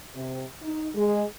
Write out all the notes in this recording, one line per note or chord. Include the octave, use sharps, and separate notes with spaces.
C3
D#4
G#3